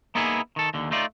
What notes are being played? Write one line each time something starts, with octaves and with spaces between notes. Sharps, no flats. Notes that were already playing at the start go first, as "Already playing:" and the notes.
A#3 B3 D#4 E4 G#4
D#3 A4
D#2 D3
A3 D#4 F4 D5